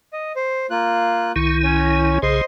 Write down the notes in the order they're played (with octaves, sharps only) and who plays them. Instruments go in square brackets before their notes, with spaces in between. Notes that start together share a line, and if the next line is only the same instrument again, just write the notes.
[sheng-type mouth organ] D#5
C5
A#3 F4 F#6
[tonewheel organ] C2 D#3 E4 [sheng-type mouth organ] C#6
[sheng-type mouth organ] C#4 C#5
[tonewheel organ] B1 C#3 G#4 [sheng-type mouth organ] C5 D#5 C6